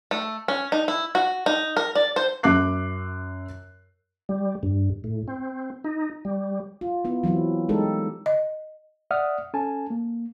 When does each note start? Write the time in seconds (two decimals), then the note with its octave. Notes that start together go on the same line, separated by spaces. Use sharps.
0.11 A3
0.48 C#4
0.72 D#4
0.88 E4
1.15 F#4
1.46 D#4
1.77 A#4
1.95 D5
2.16 C5
2.43 F#2 E5 D6 F#6 C7
4.29 G3
4.63 G2
5.04 A2
5.28 C4
5.84 D#4
6.25 G3
6.81 F4
7.05 B3 E4
7.23 E3 F#3 C4 E4
7.69 G#3 D#4 G4 A4 A#4
8.26 D#5
9.11 D5 E5 F#5 D#6 F6
9.54 C#4 A4 G#5 A5
9.90 A#3